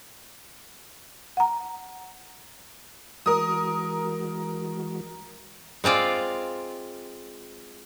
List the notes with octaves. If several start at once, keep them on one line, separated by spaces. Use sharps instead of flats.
F#5 A#5
E3 G#3 F#4 A#4 D#6
G#3 C4 F4 D5